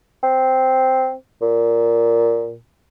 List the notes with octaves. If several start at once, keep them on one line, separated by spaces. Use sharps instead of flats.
C4
A#2